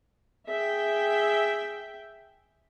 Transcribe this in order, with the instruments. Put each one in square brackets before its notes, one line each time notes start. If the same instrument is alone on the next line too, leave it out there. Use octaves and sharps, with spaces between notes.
[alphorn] G#4 [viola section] E5 G5